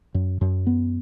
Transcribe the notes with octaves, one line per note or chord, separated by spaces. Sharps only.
F#2
F#2
B3